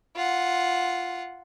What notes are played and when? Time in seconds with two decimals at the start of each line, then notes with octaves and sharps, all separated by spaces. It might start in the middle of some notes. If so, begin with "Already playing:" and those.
0.16 F4 F#5